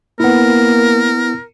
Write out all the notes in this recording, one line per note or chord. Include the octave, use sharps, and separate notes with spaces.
A#3 B3 E4 A#4